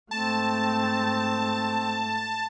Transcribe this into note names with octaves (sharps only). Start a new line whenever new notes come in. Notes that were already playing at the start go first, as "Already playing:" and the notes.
G#2 A3 C4 A5